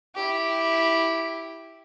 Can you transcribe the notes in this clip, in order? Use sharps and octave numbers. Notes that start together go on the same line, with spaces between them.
E4 G4